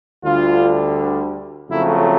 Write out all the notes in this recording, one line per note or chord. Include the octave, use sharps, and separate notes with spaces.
D2 D3 G3 F4
F2 C#3 F#3 A3 E4